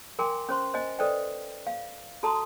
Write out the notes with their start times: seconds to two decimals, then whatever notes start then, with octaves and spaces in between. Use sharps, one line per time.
0.19 A#4 G5 G#5 C6 D6
0.49 C#4 C5 C6 C#6
0.74 C5 D#5 G#5
0.99 A4 B4 C5 D5 D#5 G5
1.67 F5
2.23 F#4 A4 A5 A#5 C6 D#6